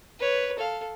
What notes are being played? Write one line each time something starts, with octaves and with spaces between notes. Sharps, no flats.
B4 C#5
A4 F5